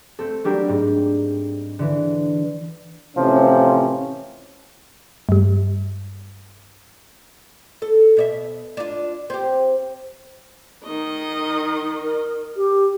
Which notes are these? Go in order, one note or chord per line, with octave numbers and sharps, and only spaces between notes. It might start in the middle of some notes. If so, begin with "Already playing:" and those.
A3 C4 A4
F#3 G3 D4 G4 A#4
G#2
D3 E3
A1 C3 F3 C#4
G2 G3
A4
B2 D5 E5
D4 F4
C4 G4
D#3 D#5
A#4
G4